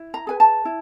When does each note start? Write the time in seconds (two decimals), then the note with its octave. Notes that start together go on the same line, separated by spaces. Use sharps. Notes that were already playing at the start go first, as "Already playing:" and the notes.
Already playing: E4
0.14 A#5
0.27 G#4 B4 G#5
0.40 A5
0.65 E4